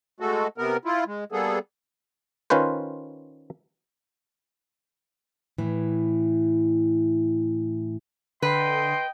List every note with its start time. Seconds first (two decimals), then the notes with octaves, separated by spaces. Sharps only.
0.20 G#3 A3 F#4 A4
0.58 C3 B3 A#4
0.85 E4 F4
1.06 G#3
1.32 G3 A#3 B3 G#4 A4
2.50 D#3 C#4 F4 B4 C5
5.58 A2 E3
8.42 D3 B4 D#5 G5 C6